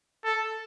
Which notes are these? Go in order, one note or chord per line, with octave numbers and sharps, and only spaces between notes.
A4